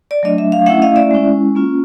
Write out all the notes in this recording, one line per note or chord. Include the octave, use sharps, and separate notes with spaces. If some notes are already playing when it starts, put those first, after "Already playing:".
D5
F#3 A3 D4 D#5
E5
F5
A3 C#4 E4 E5 F#5
D#5 F5
D5 E5
G#3 C#4 E4
A#3 C#4 F4